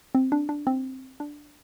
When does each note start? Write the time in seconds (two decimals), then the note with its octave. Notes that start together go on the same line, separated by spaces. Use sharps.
0.15 C4
0.32 D4
0.49 D4
0.67 C4
1.20 D4